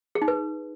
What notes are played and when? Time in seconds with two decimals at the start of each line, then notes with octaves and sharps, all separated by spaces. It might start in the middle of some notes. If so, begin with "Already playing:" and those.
0.15 G#4
0.22 D#4
0.28 B4